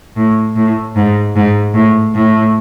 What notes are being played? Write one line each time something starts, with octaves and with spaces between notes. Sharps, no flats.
A2
A2
G#2
G#2
A2
A2